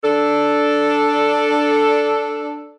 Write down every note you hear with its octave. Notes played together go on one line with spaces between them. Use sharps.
D4 A4